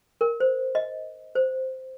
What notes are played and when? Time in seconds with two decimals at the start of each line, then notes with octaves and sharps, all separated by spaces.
0.21 A#4
0.40 C5
0.75 D#5
1.35 C5